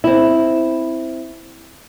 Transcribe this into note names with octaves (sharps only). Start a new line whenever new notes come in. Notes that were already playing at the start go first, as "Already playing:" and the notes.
C4 E4